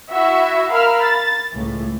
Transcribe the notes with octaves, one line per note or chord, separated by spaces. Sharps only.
E4 F#4 E5
A#4 F5 B5 E6 F6
A6
C#2 A2 E3